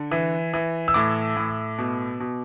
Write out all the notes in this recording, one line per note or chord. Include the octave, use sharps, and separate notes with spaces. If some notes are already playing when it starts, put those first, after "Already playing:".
Already playing: D3
E3
E3
E6
A2 D6
A2
B2
B2